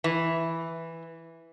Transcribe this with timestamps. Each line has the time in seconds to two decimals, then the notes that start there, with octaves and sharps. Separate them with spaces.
0.04 E3